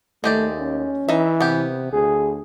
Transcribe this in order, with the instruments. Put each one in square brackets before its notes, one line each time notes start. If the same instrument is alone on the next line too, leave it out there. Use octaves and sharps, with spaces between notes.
[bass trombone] D#2 [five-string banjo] G#3 G4 D5 [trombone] A3
[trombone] C#4
[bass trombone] E3 [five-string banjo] D#4 E5
[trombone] C3 [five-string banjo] B3 G4
[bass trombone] D2 [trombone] G#4